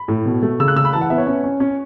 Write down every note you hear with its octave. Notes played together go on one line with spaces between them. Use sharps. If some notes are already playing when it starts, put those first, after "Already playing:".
Already playing: B5
A2
B2
A3
C#3 E6
F#6
C#3 E6
B5
E3 A5
F#5
B3 E5
C#5
C#4
C#4
C#4